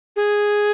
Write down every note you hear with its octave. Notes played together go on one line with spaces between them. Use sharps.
G#4